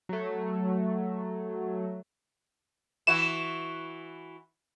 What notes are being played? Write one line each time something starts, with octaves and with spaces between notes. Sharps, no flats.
F#3 A3
E3 E4 F#4 E7